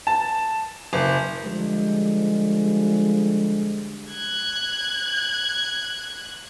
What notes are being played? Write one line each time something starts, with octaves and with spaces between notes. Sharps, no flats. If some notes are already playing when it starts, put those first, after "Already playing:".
A5
F#1
D3 F3 G3 G#3
F#6 G#6